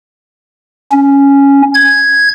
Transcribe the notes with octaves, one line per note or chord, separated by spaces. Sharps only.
C#4
G#6